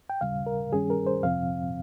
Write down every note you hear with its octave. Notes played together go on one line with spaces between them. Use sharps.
G5
D#2 C#3 G3 F5
A#4
G2 D#3 G3 C#4 G#4
A#4
C5
F2 C3 F3 C4 F5